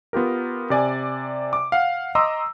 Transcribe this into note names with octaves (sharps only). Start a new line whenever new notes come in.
B3 F4 G4 A#4
C3 D5 G#5
D6
F5 F#5
D#5 A#5 C6 D6 E6